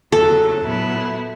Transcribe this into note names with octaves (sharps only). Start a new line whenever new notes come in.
E2 C#3 F#3 A4
A#2 F#3 B3 E4